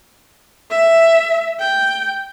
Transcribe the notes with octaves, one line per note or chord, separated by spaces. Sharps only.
E5
G5